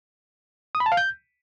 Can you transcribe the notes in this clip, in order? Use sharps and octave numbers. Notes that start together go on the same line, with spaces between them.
D#6
B5
A5
F5
G6